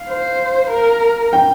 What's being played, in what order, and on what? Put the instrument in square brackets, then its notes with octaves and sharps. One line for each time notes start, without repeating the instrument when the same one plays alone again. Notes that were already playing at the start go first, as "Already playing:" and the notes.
Already playing: [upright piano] F5
[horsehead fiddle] C5
A#4
[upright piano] G5